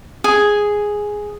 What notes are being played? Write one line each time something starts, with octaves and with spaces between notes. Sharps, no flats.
G#4